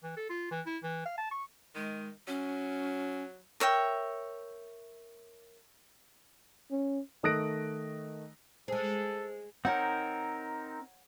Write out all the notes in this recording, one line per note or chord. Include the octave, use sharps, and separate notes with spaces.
E3
A4
F4
E3
E4
E3
F5
A5
C#6
D#3 G#3
F#3 C#4
A#4 C#5 E5 G5
C#4
D#3 A3 D#6 F#6 A#6 D7
G#3 G#4 A4 C5 G#5
C4 D#4 A#4 C#5 F#5